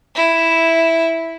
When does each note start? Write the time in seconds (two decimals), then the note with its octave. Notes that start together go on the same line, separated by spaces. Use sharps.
0.15 E4